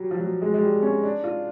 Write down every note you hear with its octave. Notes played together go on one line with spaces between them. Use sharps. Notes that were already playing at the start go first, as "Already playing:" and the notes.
Already playing: F#3 G3
F3
F#3
G#3
G#3
G3
C#4
D4
F4